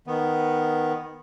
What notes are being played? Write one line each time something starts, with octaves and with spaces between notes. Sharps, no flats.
D#3 B3